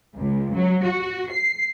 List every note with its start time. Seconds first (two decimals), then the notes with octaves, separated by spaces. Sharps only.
0.15 C#2
0.54 F#3
0.84 F#4
1.32 C7